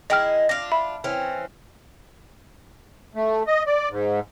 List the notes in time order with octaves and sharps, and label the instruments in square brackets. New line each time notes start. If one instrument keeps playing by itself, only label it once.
[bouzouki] G#3 D#4 E4 [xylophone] D#5 G5 F6
[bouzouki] D4 F4 [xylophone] A#6
[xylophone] E5 B5
[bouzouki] E3 C4 C#4
[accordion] A3
D#5
D5
G#2